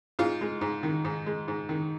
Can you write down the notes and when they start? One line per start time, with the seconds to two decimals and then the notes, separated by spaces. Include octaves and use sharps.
0.19 G#2 F4
0.41 G#3
0.61 G#2
0.83 D#3
1.05 G#2
1.26 G#3
1.48 G#2
1.69 D#3